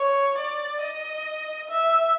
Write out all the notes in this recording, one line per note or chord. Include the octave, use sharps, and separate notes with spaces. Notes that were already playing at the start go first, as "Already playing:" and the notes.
Already playing: C#5
D5
D#5
E5